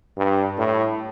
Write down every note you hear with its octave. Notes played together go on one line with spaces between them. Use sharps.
G2
A2